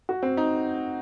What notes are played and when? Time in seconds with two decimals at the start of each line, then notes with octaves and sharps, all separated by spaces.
0.09 F#4
0.23 C4
0.37 D#4